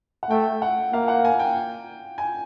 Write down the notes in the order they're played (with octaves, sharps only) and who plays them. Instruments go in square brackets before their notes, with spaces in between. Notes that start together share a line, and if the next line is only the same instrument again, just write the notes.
[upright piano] F#5
[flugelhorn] A3 [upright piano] G5
[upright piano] F#5
[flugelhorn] A#3 [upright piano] F5
[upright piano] F#5
G#5
G5
G#5